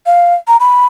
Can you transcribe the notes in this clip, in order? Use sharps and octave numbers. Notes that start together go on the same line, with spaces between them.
F5
A#5
B5